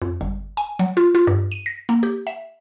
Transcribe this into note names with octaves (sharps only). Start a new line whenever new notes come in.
F2
G1
G#5
F#3
F4
F4
G2
D#7
A#6
A#3
G4
E5